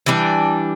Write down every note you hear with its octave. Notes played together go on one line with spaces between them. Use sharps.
E3 G3 D4